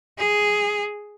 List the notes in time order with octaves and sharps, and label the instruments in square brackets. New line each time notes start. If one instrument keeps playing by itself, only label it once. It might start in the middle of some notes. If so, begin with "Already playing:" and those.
[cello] G#4